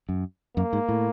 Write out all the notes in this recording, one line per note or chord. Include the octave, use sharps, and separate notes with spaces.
F#2
F#2 A#3
G#2
A2